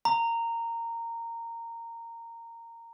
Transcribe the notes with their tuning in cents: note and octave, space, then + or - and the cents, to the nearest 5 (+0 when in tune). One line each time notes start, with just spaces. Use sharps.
A#5 -15